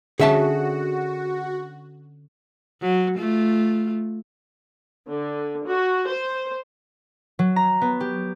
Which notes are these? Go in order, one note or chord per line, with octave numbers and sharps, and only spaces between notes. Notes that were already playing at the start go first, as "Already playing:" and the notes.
D3 C#4 F#4 G#4 E5 A5
F#3
A3 F4
D3
F#4
C5
F#3
A#5
B3
G4